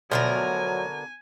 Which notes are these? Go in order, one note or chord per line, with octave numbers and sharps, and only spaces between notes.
D2 B2 D3 F3 F#3 A#4 G#5